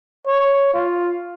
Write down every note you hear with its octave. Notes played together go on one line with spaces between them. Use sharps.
C#5
F4